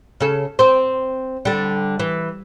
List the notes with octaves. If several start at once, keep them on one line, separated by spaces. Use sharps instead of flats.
C#3 A4
C4 C5
D3 G3
E3